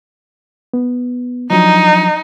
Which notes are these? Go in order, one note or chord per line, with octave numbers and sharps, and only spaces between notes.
B3
F3 F#3 D4 D#4